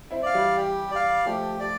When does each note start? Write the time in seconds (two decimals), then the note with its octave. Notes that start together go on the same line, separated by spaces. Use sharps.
0.11 C4 E4
0.23 D5 F5
0.35 E3 G3
0.57 G4
0.91 D5 F5
1.26 F3 A3 G4
1.60 D5